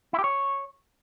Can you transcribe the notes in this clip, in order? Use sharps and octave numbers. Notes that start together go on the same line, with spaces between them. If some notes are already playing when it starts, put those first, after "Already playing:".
E4
G4
C#5